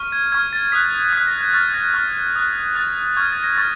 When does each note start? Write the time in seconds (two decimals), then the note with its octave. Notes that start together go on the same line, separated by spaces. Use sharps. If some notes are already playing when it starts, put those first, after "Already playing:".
Already playing: C#6 F6
0.12 G#6
0.32 C#6 F6 G#6
0.53 A6
0.72 D#6 F#6 B6
1.13 D#6 F#6 B6
1.27 A#6
1.41 G#6
1.53 C#6 F6 A6
1.68 A6
1.74 A#6
1.94 C#6 F6
2.36 D#6 F#6
2.75 D#6 F#6 A6
3.16 C#6 F6 G#6
3.30 A6
3.44 A#6
3.57 C#6 F6 A6